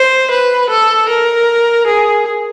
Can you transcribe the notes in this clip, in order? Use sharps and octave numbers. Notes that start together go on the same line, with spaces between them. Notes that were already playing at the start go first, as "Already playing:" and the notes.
Already playing: C5
B4
A4
A#4
G#4